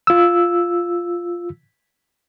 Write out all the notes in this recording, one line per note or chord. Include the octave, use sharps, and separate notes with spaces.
F4 E6